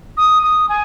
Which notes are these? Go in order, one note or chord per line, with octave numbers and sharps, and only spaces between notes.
D#6
D#6
G#5